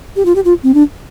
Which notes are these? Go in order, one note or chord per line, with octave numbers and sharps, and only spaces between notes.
G4
F4
G4
F4
C4
D4